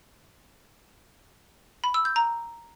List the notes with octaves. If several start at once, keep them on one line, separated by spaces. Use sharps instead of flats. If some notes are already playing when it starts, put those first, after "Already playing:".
B5
E6
G6
A#5